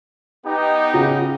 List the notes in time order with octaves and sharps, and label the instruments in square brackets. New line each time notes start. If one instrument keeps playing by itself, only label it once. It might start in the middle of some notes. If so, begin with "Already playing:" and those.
[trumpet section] B3 D#4 [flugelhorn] G4
[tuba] C#3 [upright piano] F#4